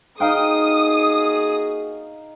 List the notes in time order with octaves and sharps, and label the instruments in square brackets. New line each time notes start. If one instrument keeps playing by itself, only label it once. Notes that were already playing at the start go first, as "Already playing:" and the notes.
[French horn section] A#3 F#4 G#4 [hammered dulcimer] D#4 F5 G5 [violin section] D#6